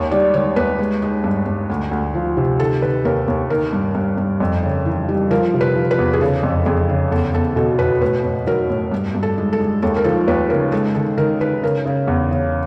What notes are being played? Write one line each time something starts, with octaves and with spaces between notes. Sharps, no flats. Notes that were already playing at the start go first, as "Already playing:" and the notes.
Already playing: D#2 G#2 C#5
G3 D5
D#3 C#5
D#2 B4
G#3
G#3
G2
G2
D2
D2
F3
C3
D#3 A4
D#3 B4
D#2 A#4
D#2
D#3 A#4
G2
G2
G2
F2
C#3
E3
G3
F3 A#4
C3
B4
F3
B4
E2
G#4
C#3 A4
F2
F2 G#4
C#3
E2 A4
E2 A4
B2 A4
B2 B4
A2 B4
A2
F#3 A#4
A2
G2
G2
A4
G#3
A4
G#3
D#2 A4
A#4
F3 A4
D#2 B4
C#3 A#4
G#3 A4
D#3 A4
D#3 A#4
D#3 B4
C#3 A#4
C#3
E2
C#3